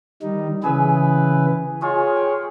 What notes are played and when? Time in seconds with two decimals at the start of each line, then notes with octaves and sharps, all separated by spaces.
0.22 D#3 G3 D#4
0.64 C#3 E3 G#4 B4 G#5 E6
1.82 G#3 F4 G#4 C#5
2.16 G5